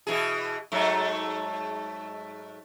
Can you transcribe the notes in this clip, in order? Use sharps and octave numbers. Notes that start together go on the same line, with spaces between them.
B2 E3 G#4
G#2 F#3 A3